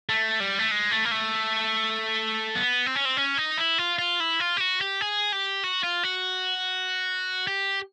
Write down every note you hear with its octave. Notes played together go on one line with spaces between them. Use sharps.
A3
G3
A3
G#3
A3
A#3
A3
B3
C4
C#4
C4
C#4
D#4
E4
F4
F4
E4
F4
G4
F#4
G4
G#4
G4
F#4
F4
F#4
G4